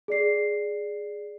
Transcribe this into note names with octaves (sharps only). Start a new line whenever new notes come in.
G#4 D5 C7